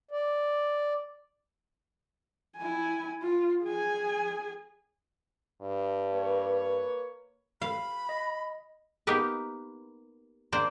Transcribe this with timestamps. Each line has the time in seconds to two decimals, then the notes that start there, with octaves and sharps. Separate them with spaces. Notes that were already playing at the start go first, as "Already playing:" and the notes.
0.11 D5
2.57 E4 G#5
3.23 F4
3.64 G#4 G#5
5.62 G2
6.14 A#3 B4 C#5
7.62 F5 B5
8.09 D#5
9.07 A#3 B3 D#4 G4 A#4 B4
10.52 A#3 D4 C5 D5